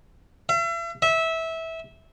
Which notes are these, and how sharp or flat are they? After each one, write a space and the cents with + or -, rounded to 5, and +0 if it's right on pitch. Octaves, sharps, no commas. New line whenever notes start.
E5 +40
E5 -20